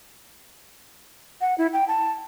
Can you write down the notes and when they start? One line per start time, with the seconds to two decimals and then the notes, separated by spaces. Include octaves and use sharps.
1.41 F#5
1.58 E4
1.73 G5
1.88 A5